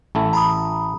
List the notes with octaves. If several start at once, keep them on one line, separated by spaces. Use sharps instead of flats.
A1 A3 E4
A#5 B5 D#6